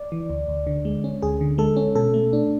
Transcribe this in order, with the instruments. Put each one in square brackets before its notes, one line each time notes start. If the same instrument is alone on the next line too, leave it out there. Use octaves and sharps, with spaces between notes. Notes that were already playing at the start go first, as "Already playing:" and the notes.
Already playing: [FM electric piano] D5
E3
D2
D2
D3
G#3
C#4
D2 G#4
D3
G#3 A4
C#4
B2 A4
A3
D4